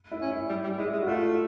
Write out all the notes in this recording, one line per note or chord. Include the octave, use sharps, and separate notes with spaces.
E4
C#4
E4
G3
G3
G#3 E4
G#3
F#4
A3 F4